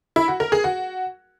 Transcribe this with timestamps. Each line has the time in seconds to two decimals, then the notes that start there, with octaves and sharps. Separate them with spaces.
0.16 E4
0.28 F#4
0.40 A#4
0.52 G#4
0.64 F#4